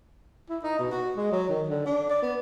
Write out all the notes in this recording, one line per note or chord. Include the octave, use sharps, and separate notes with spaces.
E4
D#4
B2
F#4
G#3
F#3
D#3
D3
D4
D5
B3